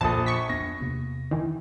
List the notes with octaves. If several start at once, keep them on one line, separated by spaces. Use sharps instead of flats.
A#1 F2 F3 A#3 A4 A5 D#6
C#6 B6
F2 B3 D4 A#6
E2 C3 A#3
D#3 E3